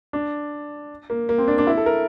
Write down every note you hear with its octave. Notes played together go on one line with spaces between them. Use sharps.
D4
A#3
A#3
C4
D4
D4
E4
A4
A#4